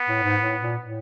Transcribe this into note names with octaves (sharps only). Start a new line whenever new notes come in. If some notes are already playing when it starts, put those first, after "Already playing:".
Already playing: B3
A2
G#2
A2
A#2
A2